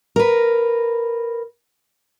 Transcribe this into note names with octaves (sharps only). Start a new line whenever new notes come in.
A#4 B4